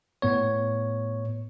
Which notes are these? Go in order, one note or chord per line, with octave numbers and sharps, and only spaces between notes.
A2 B3 C#5